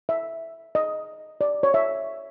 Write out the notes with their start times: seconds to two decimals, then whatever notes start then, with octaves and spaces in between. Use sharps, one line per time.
0.09 E5
0.75 D#5
1.41 D5
1.63 C#5
1.74 E5